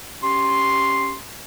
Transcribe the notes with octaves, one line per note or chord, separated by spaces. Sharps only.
C#4 G4 C6